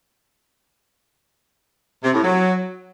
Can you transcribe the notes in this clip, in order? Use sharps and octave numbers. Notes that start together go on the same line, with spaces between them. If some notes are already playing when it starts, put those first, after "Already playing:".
C3
A2
F#3